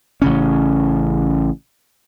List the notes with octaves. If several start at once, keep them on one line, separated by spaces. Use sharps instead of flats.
A1 C#3 C#4